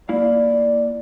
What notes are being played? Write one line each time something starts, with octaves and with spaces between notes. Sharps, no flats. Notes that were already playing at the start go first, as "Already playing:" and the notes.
A#3 E4 D5 F5